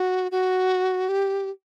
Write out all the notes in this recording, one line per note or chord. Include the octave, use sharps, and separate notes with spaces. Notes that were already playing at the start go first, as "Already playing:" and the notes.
Already playing: F#4
F#4
G4